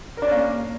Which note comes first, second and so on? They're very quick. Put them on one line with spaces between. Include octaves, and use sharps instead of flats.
A#4 D4 C#4 A#3